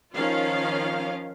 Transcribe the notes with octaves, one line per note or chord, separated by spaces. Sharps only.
D#3 F3 C#4 F4 F5